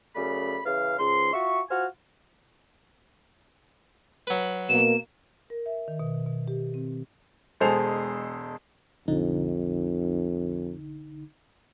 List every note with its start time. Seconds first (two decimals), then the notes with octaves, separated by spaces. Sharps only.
0.16 F#2 C#3 A3 D5 B5
0.65 C#3 E3 F5
0.98 C#2 G#2 C6
1.33 F4 F#4 E5 C#6
1.70 F4 F#4 C5 F#5 G#5 F6
4.27 F#3 B4
4.69 B2 A#3 E7
5.50 A#4
5.66 E5
5.88 D#3
6.00 B2
6.27 B2
6.48 G4
6.74 C4
7.60 E1 G#3 A4 C5 G#5 F7
9.08 B1 F2 D3 D#4